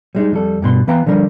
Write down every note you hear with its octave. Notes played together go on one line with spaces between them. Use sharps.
G3 G#3 D#4
F2 G3 A4
G2 B2 C6
E3 B3 B4 F5 G5 A#5
D3 F3 G3 A#4